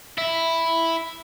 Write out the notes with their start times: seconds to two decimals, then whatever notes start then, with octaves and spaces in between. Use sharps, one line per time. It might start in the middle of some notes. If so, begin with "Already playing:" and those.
0.18 E4